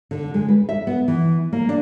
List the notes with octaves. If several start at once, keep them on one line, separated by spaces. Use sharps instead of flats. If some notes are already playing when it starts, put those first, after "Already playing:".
D3
G#3
B4
E5
B3
E3
A#3
D4